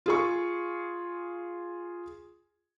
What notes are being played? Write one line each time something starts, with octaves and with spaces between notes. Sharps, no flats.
F4 G#4 C#6